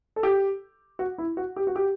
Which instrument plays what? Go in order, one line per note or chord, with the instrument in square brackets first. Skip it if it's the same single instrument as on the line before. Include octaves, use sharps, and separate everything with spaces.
[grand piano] A4
G4
F#4
E4
F#4
G4
F#4
G4